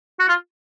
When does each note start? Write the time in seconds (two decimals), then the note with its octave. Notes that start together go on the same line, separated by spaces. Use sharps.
0.19 F#4
0.28 F4